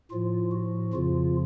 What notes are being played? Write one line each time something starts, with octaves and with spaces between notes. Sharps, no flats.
A2 F3 F4
F#4
F2 C#3 F3 F4